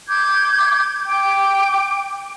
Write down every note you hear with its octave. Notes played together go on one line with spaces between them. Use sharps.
D6 G6 G#6
G5 D6